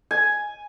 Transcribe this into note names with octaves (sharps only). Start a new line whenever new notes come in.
G#5